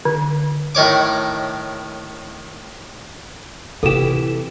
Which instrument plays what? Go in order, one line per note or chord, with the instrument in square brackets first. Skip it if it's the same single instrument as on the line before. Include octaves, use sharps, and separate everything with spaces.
[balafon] D3
[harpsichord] A2 D#3 C#5 D6
[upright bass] C3 [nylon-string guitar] E3 G4 [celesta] A4 E7